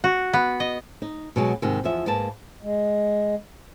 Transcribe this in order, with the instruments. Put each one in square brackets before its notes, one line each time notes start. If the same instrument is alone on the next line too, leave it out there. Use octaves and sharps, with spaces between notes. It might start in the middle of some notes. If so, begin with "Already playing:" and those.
[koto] F#4
B3
D#5
[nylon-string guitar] D#4
B2 F#3 G#3
D#2 G#2 C3 D#3
E2 F3 E5
G#2 A#3 B4 A5
[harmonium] G#3